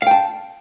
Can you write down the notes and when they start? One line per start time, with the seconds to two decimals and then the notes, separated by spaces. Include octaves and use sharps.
0.02 F5
0.07 G5
0.11 A5